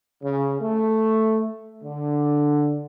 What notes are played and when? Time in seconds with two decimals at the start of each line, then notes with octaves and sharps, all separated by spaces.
0.23 C#3
0.61 A3
1.84 D3